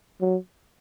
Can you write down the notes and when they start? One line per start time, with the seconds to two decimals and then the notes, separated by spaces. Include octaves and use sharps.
0.21 F#3